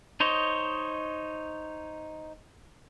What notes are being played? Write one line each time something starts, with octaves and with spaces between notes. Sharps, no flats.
D#4 C5 C#5 D#5